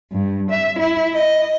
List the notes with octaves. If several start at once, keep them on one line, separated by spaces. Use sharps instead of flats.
G2
E5
E4
D#5